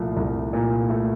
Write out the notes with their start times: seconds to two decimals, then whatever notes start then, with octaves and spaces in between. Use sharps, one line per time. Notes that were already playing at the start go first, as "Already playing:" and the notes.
Already playing: C2 A#2 F3 A3
0.17 C2
0.53 A#2
0.89 A3